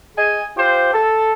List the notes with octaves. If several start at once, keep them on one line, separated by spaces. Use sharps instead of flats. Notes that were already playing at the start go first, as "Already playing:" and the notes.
G#4 D#5 G#5
F4 G4 C5
A4